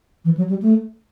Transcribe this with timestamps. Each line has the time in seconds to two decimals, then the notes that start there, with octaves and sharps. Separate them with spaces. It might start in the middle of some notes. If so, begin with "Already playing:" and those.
0.25 E3
0.37 F#3
0.49 G3
0.62 A3